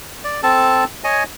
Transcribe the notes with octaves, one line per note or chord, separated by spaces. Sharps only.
D5
C4 A4 A5
C#5 D#5 G#5